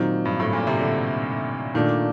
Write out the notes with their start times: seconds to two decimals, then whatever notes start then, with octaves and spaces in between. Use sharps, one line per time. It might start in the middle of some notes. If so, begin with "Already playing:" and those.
Already playing: A#2 D#3 F#3 C4 D#4
0.25 G2
0.40 A2
0.53 A#2
0.67 C3
0.81 D3
1.74 A#2 D#3 A3 D4